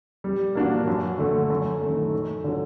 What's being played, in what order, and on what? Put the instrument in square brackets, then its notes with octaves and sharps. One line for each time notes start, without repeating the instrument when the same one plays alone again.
[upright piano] G3
A#3 D4 F#4
F#2
D3 A3
F#2
D#3 A3
F#2
D3 F#3